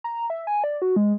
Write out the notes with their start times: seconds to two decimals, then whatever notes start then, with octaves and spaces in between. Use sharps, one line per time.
0.04 A#5
0.30 E5
0.47 G#5
0.64 D5
0.82 F#4
0.96 G#3